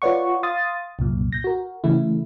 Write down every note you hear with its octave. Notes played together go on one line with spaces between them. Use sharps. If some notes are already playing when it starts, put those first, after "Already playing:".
F4 B4 C#5 D5 F#5 C#6
F5 C6 D#6 A6
C2 F#2 A#2
G6 A#6
F#4 A#4
C#3 E3 A3 E4